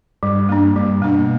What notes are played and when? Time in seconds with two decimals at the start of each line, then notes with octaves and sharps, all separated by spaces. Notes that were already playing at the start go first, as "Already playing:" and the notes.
0.23 G2 G3
0.49 A#3 D4
0.76 G2 G3
1.02 B2 A#3 D4